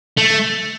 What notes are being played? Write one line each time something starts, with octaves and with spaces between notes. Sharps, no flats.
A3